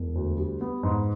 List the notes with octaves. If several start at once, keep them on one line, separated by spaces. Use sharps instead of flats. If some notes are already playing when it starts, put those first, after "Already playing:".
Already playing: E1
D2
G3
B3
G#2